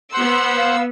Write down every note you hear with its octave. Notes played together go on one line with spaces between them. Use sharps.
B3 C5 F#5 C6 E6
F5